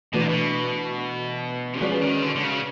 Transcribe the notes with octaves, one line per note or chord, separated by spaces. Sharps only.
B2 E3 A3 D4 F#4 B4
A#2
B2
F3 G#3 C#4 F#4 B4 D5
D#3
D3
D3
C#3